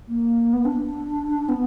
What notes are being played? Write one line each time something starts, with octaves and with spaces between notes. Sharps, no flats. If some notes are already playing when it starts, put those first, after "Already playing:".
A#3
B3
D4
B3